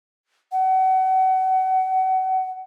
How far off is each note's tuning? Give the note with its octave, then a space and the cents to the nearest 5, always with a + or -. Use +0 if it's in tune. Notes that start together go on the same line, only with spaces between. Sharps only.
F#5 +30